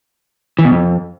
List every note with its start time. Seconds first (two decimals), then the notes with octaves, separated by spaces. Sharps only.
0.59 E3
0.65 B2
0.71 F2